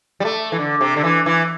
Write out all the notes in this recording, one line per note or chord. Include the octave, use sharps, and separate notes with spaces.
G3
A3
E3
D3
C3
D3
E3
E3